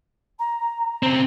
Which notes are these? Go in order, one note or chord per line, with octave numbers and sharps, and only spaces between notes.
A#5
C#3 C4